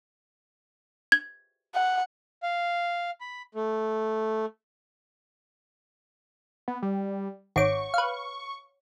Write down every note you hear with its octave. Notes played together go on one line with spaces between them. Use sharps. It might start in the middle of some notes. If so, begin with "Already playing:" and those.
G#6
F#5
F5
B5
A3
B3
G3
G#1 C#5 E5 F#5 C#6 D6
B4 F5